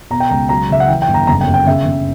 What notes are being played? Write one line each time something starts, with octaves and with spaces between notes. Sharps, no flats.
B2 A#5
G5
C#2 A#5
F#3 A#5
C#3 E5
F#5
E3 G5
G5
G1
A#5
F#1 A#5
G5
F#2
G5
C#3 E5
C#3